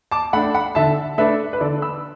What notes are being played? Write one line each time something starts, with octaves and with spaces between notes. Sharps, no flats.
A5 D6
A3 D4 F#5 B5
F#5 B5
D3 E5 A5
A3 D4 B4 E5
B4
D3 A4 D5
B5 E6